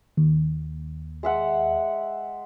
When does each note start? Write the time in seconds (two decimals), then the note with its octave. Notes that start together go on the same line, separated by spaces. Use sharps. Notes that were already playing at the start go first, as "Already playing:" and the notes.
0.17 D#2
1.23 G#3 E5 F#5